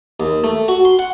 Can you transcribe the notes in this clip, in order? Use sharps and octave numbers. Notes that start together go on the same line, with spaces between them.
D#2
A3
F#4
C6
F#5